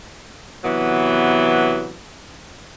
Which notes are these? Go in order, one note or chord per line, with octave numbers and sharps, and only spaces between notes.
C3 E3 F#3 B3